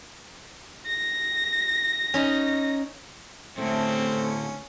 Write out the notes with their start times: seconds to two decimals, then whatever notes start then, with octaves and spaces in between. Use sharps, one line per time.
0.87 A#6
2.14 C#4 D#4
3.58 A2 D3 A3 C4 C#4